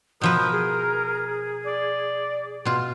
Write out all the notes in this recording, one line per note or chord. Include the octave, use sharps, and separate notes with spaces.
B2 F3 A#4 B4 D#6 G6
G#4
D5
B2 F4